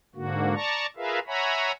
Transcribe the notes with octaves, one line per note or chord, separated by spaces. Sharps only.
G#2 D3 A#3 F#4
D5 A5 A#5 C#6
F4 G#4 A#4 B4 E5 F5
C#5 E5 F#5 G#5 A#5 B5